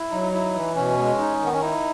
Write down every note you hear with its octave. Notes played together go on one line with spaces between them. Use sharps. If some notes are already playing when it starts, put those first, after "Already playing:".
Already playing: E4
F#3 D#4
D#4
E4
E3
B2 C#4
G#3
D#4
D#3
B3
C#4
D#4 E4